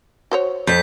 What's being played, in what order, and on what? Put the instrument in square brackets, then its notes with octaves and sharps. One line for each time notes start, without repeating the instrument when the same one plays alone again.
[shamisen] F#4 C5 C#5
[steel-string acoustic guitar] F2 [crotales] G6 B6